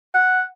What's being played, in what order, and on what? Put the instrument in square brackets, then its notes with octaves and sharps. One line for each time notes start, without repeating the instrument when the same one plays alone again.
[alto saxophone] F#5